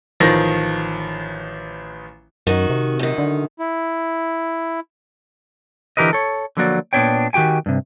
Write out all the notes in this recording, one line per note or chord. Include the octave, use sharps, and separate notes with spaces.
A1 D#3 F3 A#6
F#2 D#3 F#4
C3
F#2 D#3
D3
E4
D3 E3 G4 A#4 B4 D#5
A4 C#5
D3 F3 F#3 A#3 F#4 D5
A#2 B3 C4 D4 C#5 G5
D#3 F#4 G4 G5 G#5
G2 C3